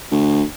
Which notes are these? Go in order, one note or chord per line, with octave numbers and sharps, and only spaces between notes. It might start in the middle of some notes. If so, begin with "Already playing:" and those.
D2